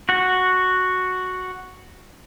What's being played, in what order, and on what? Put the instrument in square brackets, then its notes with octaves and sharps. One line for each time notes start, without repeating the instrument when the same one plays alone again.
[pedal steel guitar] F#4 F#5